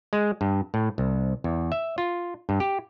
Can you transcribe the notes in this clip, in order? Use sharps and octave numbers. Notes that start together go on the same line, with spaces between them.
G#3
G2
A2
C2
E2
E5
F4
G2
G4